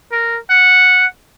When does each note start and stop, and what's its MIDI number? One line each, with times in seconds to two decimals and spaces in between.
0.12 0.38 70
0.50 1.06 78